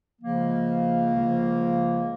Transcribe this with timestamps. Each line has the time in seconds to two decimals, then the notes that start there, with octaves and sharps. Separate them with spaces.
0.22 C#2 C#3 F3 A#3
1.14 C#2 C#3 F3